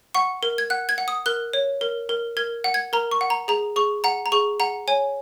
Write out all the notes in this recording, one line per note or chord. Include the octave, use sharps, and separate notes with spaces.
F#5 C#6
A#4
G#6
F#5 F#6
G#6
F#5
D#6
A#4 F#6
C#5
A#4
A#4
A#4 G#6
F#5
G#6
A#4 A#5
C#6
F#5
A#5
G#4 A#5
G#4 C#6
F#5 A#5
A#5
G#4 C#6
F#5 A#5
C#5 G#5